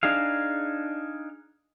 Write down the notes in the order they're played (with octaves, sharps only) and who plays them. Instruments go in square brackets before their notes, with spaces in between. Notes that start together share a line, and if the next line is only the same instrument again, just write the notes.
[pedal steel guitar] D4 D#4 G#4 F5